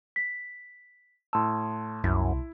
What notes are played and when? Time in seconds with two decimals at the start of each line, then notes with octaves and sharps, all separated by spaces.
0.16 B6
1.33 A2 A5 C6 E6
2.04 C2 F#2 B2 E4